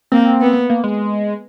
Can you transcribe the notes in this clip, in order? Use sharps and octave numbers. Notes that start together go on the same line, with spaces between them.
A#3 C4
B3
A#3
G#3